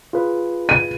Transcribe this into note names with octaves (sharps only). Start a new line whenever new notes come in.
F4 G#4 B4
D#7